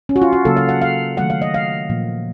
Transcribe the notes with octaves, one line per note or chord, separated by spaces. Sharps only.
C#4
F#4
F4
F#4
C#3 F#3 A#3 A4
F5
F#5
F5
D#3 F#3 A3 F#5
F5
D#5
F5
A#2 F3 A#3